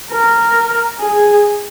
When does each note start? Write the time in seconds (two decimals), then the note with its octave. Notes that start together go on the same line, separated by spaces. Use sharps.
0.11 A#4
1.00 G#4